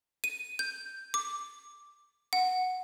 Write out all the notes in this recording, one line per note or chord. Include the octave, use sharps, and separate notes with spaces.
D#7
G6
D6
F#5